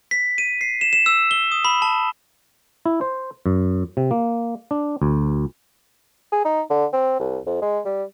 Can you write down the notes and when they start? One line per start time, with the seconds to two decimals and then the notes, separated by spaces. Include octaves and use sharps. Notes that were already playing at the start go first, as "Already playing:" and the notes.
0.11 B6
0.38 D#7
0.61 C7
0.81 E7
0.93 E7
1.06 E6
1.31 G7
1.52 D#6
1.65 B5
1.82 A5
2.86 E4
3.01 C5
3.46 F#2
3.97 C3
4.11 A#3
4.71 D4
5.02 D2
6.32 G#4
6.45 D#4
6.70 D3
6.93 C4
7.20 C2
7.47 F2
7.62 G#3
7.85 G3